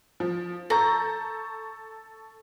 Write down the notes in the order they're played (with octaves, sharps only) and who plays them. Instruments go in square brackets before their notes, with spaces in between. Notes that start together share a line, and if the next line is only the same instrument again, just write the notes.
[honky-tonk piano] F3
[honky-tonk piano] A4 C#6 G6 [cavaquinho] A#5